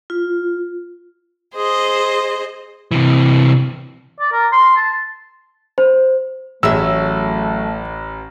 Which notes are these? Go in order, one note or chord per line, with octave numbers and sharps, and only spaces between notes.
F4
G#4 C5 D#5
C3 E3
D5
A#4
C6
A5
C5
A1 F#3 A3 G#4 E5 E6